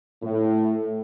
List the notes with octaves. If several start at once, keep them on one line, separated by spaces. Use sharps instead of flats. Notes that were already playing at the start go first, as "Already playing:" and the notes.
A2